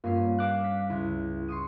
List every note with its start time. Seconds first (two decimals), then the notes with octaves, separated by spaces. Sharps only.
0.04 G2 A#3 C#4 F4 C7
0.39 F5 D6 F#6
0.64 B6
0.90 C#2 E4
1.48 C6 C#6 D#6